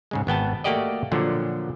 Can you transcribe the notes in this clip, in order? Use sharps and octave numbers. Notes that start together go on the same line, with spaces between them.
G#2 C#3 G#3
G#1 B3 G5 A5
A3 A#3 F#4 G4 D5 D#5
A#2 D3 F3 F#3